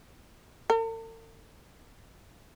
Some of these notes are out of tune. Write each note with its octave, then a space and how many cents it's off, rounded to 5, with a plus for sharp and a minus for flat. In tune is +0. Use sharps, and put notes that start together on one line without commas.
A4 +45